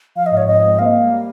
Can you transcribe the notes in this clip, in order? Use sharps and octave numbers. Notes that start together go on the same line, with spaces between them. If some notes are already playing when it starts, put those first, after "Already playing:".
F3 F5
D#5
G#2
C#5
C4 D#5
G#3
A#3 F5
G3
G3